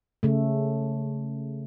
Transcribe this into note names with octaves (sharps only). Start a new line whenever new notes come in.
C#3 A3